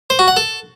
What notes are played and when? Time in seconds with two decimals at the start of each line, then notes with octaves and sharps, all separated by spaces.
0.10 C5
0.19 F#4
0.28 F#5
0.37 A4